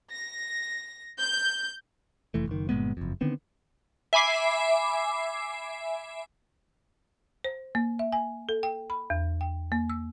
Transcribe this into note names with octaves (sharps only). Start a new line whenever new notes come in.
A#6
G6
F1 E3 A3
F#1 D#3
G1 A#2 G#3 B3
F#1 F2
D3 D#3 B3 C4
E5 G#5 B5 D6 C7
C5
A#3
E5
G#5
A4
G5
B5
E2
G5
A#3
E6